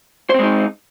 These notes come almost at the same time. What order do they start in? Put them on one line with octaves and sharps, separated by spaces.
C5 C4 G#3 D#4